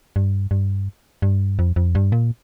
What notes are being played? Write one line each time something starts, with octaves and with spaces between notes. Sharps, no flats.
G2
G2
G2
F2
F2
G2
A#2